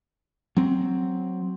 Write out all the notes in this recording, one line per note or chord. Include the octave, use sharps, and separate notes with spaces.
F#3 C4